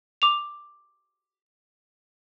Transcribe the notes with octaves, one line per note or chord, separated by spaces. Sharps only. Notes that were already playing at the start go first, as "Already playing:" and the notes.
D6 F7